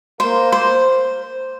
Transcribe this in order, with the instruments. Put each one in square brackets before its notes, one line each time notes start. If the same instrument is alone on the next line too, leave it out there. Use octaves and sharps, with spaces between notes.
[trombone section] A#3 [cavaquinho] C5
[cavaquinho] C5